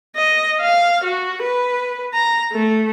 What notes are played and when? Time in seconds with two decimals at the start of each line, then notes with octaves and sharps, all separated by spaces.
0.16 D#5
0.61 F5
1.04 F#4
1.43 B4
2.14 A#5
2.52 A3